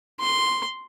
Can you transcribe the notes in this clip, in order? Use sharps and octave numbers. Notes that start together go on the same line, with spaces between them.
C6